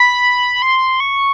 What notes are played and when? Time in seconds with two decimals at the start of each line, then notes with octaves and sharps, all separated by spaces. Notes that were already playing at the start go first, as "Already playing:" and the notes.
Already playing: B5
0.62 C6
1.00 C#6